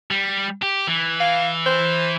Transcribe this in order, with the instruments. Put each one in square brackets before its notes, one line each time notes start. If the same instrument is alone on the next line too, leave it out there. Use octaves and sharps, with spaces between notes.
[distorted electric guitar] G3
G4
E3
[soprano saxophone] F5
C5